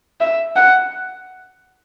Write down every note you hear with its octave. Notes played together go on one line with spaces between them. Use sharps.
E5
F#5